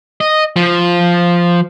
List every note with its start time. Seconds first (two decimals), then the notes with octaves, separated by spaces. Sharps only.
0.21 D#5
0.56 F3